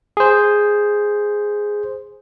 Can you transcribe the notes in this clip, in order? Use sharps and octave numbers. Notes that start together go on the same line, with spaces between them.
G#4 C5